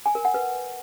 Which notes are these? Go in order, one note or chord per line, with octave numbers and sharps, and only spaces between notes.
G#5
A#4
F#5
B4